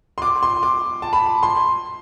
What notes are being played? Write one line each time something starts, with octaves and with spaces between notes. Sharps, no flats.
C6
D6
C6
D6
A5
B5
C6